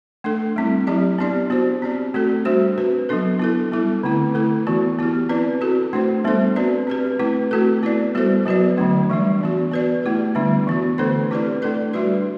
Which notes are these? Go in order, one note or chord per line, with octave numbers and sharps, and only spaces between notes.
A3 D4 A4
G3 C4 E4
F#3 C4 E4 G4 D5
B3 D4 G4 D5
B3 F#4 C5
C4 G4 D5
A3 C4 F#4 A4
G3 D4 F#4 C5
C4 F#4 B4
F#3 B3 D4 A4
B3 E4 A4
G3 B3 E4 A4
D3 A3 C4 E4
D3 A3 E4 A4
E3 B3 F#4
B3 E4 G4
C4 E4 B4 D5
C4 F#4 A4
A3 D4 F#4 C5
G3 B3 D4 A4 C5
C4 F#4 B4 D5
C4 G4 B4
A3 C4 E4 B4
A3 C4 F#4 A4
B3 E4 B4 D5
G3 B3 F#4 A4 C5
F#3 B3 F#4 B4 D5
D3 F#3 A3 D4
E3 G3 D4
E3 B3 F#4
B3 F#4 B4 D5
A3 E4 G4
D3 G3 B3 D4
E3 B3 F#4
D3 A3 D4 A4 C5
C4 E4 G4 B4 D5
A3 D4 A4 D5
G3 D4 F#4 B4 D5